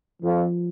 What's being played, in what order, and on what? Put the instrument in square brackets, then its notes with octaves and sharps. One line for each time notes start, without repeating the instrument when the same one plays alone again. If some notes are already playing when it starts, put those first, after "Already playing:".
[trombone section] F2 [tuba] F3